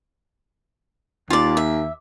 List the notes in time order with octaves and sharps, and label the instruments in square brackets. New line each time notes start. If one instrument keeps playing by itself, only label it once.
[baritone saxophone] D#2 [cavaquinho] F4 D5
[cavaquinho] E5